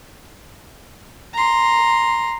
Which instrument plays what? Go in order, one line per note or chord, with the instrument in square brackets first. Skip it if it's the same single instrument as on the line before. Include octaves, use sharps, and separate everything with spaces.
[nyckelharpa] A#5 C6